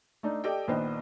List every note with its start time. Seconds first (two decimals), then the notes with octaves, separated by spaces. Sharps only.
0.23 A3 D4 D#4
0.44 G4 A4 D5 D#5 G5
0.68 A#1 D#3 B3 D4 C5 D#5